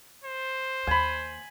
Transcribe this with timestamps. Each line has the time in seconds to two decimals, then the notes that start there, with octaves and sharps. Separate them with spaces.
0.24 C5
0.87 D#2 G#5 B5